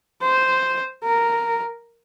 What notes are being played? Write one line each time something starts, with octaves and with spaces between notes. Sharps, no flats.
C5
A#4